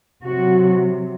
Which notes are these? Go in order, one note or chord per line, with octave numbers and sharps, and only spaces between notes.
C3 F#3 F#4